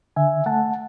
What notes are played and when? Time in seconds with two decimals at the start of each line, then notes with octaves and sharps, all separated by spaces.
0.16 D3 E5 G#5
0.46 A3 F#5 A5